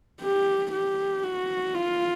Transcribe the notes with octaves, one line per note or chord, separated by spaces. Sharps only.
G4
G4
F#4
F4